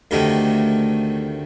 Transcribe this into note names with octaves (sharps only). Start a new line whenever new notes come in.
D2 C3 D#3 A3 A#4